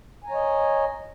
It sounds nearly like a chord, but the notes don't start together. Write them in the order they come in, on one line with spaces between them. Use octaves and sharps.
G#5 A#5 C#5 D#5